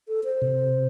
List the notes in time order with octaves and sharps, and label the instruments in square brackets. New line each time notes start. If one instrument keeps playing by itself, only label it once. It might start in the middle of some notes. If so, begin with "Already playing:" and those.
[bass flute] A4
C5
[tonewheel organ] C3